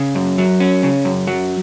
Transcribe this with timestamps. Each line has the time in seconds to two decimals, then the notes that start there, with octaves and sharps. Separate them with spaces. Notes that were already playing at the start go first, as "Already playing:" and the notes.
Already playing: C#3
0.15 F#2
0.38 F#3
0.60 C#4
0.83 C#3
1.05 F#2
1.27 F#3